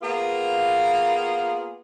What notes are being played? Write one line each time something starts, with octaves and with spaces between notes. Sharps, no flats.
A#3 B3 F4 G#4